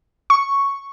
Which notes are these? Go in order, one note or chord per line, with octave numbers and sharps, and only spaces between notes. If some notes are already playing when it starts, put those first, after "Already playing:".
C#6